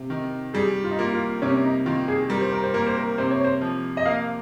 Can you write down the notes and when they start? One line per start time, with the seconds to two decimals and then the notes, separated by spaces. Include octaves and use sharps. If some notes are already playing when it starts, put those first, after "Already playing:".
Already playing: C3
0.10 D#3
0.54 G3 G#4
0.84 F4
0.91 D#4
0.99 A#3 F4
1.13 F4
1.42 C3 C#4
1.64 D#4
1.86 D#3 F4
2.08 G#4
2.30 G3 A#4
2.41 C5
2.52 A#4
2.63 C5
2.74 A#3 A#4
2.86 C5
2.97 A#4
3.18 C3 C5
3.31 C#5
3.44 C5
3.61 F3
3.97 D#5
4.06 A#3 F5